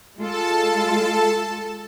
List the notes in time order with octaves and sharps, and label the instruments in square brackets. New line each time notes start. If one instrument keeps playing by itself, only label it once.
[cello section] G#3 F4 [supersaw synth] A4 A5